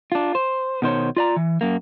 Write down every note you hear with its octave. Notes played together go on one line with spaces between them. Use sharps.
D4 F4
C5
B2 D#3 C5 C#5
F4 D5 A#5
E3
F#2 A#3